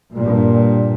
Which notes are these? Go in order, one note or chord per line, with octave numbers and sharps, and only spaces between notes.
G2 A#2